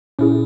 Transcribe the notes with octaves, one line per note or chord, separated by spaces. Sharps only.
A#2 C#4 E4 G#4